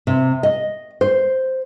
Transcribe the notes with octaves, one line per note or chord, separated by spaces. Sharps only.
C3
D#5
C5